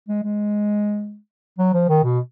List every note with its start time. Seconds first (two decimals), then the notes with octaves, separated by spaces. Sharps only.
0.09 G#3
0.23 G#3
1.59 F#3
1.74 F3
1.89 D#3
2.03 B2